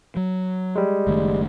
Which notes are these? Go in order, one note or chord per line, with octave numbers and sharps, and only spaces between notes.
F#3
G3 G#3
F#1 D#3 A3